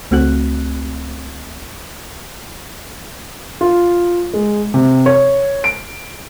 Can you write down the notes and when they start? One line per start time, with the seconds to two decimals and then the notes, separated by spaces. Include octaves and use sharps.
0.11 C#2 A3 C4 F#4 F#6
3.61 F4
4.34 G#3
4.74 C3
5.06 C#5
5.64 D7